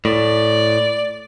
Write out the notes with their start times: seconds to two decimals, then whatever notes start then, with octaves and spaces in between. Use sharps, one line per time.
0.05 A2 D5